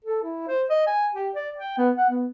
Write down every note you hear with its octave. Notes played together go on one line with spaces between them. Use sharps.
A4
E4
C5
D#5
G#5
G4
D5
G5
B3
F#5
B3